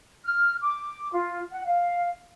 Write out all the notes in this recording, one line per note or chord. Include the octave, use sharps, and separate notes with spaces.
F6
D6
F4
F#5
F5